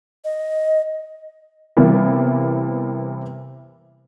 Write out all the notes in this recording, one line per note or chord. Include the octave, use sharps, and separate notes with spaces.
D#5
C3 E3 G3 A#3 B3